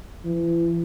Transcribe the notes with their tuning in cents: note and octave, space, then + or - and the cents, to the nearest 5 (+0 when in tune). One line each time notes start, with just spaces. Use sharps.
E3 +35